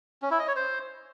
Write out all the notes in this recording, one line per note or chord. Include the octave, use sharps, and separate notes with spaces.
C#4
E4
D#5
C#5
C5